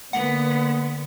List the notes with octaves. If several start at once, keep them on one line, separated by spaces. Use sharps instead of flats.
D3 A#3 B3 F#5